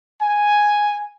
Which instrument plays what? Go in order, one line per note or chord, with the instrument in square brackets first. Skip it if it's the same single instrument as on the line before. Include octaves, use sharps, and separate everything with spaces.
[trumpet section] G#5